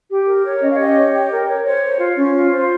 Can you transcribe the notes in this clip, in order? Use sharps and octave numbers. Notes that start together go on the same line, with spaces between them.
G4
A#4
C#5
C#4 D#5
F5
G4 D#5
C#5
G4
A#4
C#5
C5 C#5
C5
F4
C#4
F4
C5